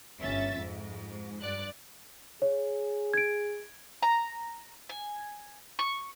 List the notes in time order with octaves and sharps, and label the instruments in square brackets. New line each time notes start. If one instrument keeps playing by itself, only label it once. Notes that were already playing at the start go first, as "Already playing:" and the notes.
[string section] G1 C#4 E5 A6
F2 G#2
G2 D5 F#6
[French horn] G#4 [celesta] C#5
[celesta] G#6 D7
[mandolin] A#5
G#5
C#6